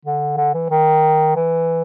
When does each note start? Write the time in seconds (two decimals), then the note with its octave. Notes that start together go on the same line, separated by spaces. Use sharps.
0.06 D3
0.37 D3
0.54 E3
0.70 D#3
1.36 E3